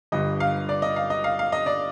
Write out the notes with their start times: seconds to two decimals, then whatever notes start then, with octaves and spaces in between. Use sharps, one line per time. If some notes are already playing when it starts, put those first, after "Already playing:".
0.12 G1 G2 D3 D#5
0.40 F5
0.69 D5
0.82 D#5
0.96 F5
1.10 D#5
1.24 F5
1.39 F5
1.52 D#5
1.66 D5